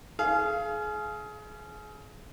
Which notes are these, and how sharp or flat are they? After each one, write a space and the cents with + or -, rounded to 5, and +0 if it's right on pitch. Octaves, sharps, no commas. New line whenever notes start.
G#4 +30 F5 -20